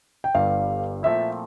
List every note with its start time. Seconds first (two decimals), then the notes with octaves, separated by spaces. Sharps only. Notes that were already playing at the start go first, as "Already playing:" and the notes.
0.24 G5
0.35 G1 G2 D3 G3 F5
1.03 A#2 F3 A3 C4 E4 E5